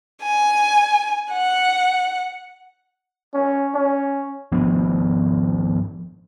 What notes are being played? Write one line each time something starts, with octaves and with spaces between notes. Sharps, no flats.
G#5
F#5
C#4
C#4
G#1 F3 B3 D4